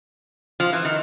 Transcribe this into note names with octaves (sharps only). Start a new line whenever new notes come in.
F3
E3
D#3